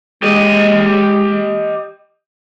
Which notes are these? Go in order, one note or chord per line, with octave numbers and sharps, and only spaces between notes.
G#3 G4 D#5